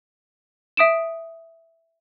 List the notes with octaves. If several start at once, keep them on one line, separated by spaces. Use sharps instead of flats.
E5 D#6 D7 E7